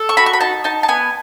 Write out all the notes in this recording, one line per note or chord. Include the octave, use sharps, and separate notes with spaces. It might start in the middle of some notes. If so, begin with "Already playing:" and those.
Already playing: A4
C#6
F#4 B5
C#6
B5
D#4 A5
D#4 A5
A5
B3 G#5